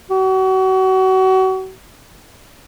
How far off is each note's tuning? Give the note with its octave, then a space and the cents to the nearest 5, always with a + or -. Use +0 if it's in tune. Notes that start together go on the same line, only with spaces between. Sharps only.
F#4 +35